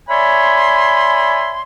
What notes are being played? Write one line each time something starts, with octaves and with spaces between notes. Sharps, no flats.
C#5 D5 E5 G#5 B5 C6